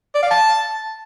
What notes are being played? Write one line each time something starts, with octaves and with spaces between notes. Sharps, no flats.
D5
F5
A5